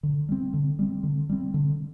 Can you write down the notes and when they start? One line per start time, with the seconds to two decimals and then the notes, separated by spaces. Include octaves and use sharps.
0.03 D3
0.29 G3 C4
0.54 D3
0.79 G3 C4
1.03 D3
1.29 G3 C4
1.54 D3